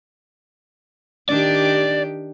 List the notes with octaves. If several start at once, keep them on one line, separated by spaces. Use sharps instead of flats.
D#3 D4 G4 D5